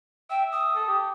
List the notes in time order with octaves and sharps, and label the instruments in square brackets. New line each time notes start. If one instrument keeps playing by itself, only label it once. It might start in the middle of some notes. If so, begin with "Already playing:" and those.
[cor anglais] E5 [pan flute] G5
[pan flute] D#6
[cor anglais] A4
G4